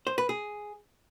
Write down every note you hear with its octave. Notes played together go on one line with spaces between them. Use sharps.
C5
B4
G#4